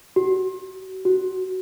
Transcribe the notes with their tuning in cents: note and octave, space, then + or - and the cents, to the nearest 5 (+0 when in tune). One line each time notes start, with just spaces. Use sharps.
F#4 +35
F#4 +15